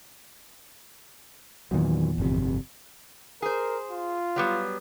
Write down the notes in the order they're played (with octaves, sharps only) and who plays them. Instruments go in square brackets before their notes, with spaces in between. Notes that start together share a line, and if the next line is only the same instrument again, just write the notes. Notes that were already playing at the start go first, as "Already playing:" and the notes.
[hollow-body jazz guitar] E2 A#2 [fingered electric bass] D#3 F#3
[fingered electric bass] G1 F2 C3
[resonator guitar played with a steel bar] G#4 C5 [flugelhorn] A#4
[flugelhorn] F4
[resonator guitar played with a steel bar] F#3 G3 B3